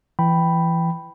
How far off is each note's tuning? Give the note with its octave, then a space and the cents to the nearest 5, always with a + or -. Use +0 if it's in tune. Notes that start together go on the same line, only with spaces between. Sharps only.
E3 +25 G5 +0 B5 +0